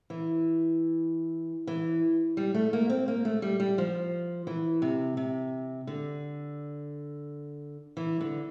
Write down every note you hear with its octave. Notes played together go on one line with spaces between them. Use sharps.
E3
E3
G3
A3
A#3
C4
A#3
A3
G3
G3
F3
E3
C3
C3
D3
E3
D3